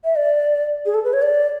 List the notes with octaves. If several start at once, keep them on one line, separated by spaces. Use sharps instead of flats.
E5
D5
G#4
A4
B4
C#5
D5